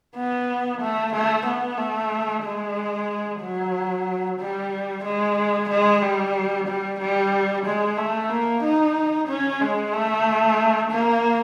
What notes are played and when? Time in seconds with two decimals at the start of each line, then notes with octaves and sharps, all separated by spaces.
0.16 B3
0.81 A3
1.13 A3
1.46 B3
1.78 A3
2.44 G#3
3.41 F#3
4.39 G3
5.05 G#3
5.69 G#3
6.02 G3
6.67 G3
7.00 G3
7.65 G#3
7.97 A3
8.30 A#3
8.63 D#4
9.28 C#4
9.61 G#3
9.93 A3
10.91 A#3